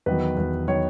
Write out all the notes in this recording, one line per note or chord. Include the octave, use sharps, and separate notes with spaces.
E2 D#3 F#3 B4
E2 D#3 F#3
D#3 F#3 C#5